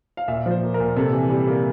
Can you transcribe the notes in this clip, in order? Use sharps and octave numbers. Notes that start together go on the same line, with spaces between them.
F5
A#2 E5
F3 C5
A#3
A#4
A#2
C3 A4
E3
G3
A#3